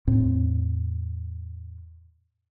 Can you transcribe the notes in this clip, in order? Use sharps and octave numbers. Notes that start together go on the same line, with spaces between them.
E2 A2 C4